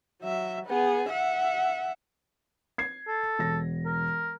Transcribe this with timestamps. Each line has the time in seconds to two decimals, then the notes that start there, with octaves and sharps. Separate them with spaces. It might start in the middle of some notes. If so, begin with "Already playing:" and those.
0.22 F#3 E5
0.65 B3 G#4
1.09 E5 F#5
2.78 G#6 C7
3.08 A4
3.39 E1 A#6
3.86 A#4